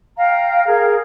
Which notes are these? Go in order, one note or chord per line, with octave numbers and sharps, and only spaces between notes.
F5 G5 A#5
G#4 A#4